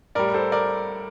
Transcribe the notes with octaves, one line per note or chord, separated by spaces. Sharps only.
A2 G3 A#4 D5
A4 C5
A#4 D5